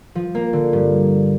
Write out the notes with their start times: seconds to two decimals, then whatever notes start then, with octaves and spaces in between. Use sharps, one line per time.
0.15 F3
0.35 A#3
0.53 D3
0.73 G2